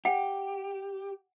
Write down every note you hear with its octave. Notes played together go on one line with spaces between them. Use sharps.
G4 F#5 G5